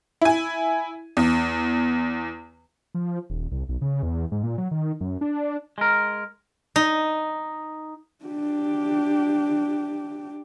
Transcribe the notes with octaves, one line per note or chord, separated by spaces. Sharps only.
E4 G#5
E2
F3
D#1
C2
B1
C#3
E2
G#2
A#2
F#3
D#3
F#2
D4
G#3 A#4
D#4
D4 G4